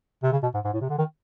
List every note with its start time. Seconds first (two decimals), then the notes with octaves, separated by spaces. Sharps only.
0.23 C3
0.32 C#3
0.43 B2
0.54 G#2
0.65 G#2
0.74 A2
0.81 C3
0.90 D3
0.98 D#3